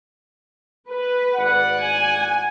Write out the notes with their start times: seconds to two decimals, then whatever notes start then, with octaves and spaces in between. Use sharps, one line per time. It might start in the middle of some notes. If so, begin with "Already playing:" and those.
0.89 B4
1.36 G#1 D5 F#5
1.80 G#5